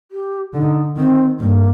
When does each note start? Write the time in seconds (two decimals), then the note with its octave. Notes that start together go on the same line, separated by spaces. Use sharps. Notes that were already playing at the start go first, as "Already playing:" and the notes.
0.12 G4
0.54 D3 D#4
0.96 D#3 C4
1.40 G2 A#3